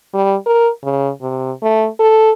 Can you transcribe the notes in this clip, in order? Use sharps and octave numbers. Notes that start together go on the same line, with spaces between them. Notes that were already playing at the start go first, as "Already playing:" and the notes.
G3
A#4
C#3
C3
A3
A4